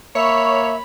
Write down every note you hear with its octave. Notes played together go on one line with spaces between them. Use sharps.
A#3 C#5 E5 B5